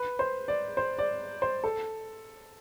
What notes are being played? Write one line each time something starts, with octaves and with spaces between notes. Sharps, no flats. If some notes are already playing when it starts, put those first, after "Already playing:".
Already playing: B4
C5
D5
C5
D5
C5
A4